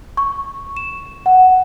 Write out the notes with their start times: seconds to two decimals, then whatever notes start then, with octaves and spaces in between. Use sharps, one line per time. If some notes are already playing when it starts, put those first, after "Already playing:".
0.17 C#6
0.77 E7
1.26 F#5